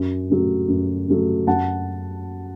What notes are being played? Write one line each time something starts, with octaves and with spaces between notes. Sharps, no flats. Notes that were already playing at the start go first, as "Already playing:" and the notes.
Already playing: F#2
C#3 F#3 A3
F#2
C#3 F#3 A3
F#2 F#5 A5